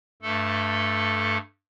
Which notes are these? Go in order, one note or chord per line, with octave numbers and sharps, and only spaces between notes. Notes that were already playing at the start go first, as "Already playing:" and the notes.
G2 A3 A4